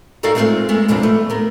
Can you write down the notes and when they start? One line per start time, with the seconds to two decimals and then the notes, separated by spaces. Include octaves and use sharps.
0.23 D#4 F#4 A4 A#4 D5 F5
0.35 G#3 A3 C4 C#4 F4 C5
0.69 G#3 A3 B3
0.88 D#2 B2 F3 A#3 C4 D4
1.03 A3
1.30 B3 A#4